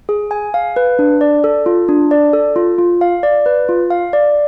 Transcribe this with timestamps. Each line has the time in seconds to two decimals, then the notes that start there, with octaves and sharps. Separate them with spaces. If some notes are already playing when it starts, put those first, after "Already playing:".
0.09 G#4
0.31 G#5
0.54 F5
0.76 B4
0.99 D4
1.21 D5
1.44 A4
1.66 F4
1.88 D4
2.11 D5
2.33 A4
2.56 F4
2.79 F4
3.01 F5
3.23 D5
3.46 B4
3.69 F4
3.90 F5
4.13 D5